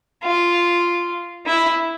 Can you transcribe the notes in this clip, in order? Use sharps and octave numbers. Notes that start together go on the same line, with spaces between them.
F4
E4